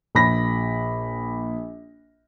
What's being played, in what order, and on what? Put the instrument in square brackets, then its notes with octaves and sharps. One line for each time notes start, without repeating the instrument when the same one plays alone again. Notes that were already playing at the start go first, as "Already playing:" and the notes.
[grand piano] A#1 B5 A#6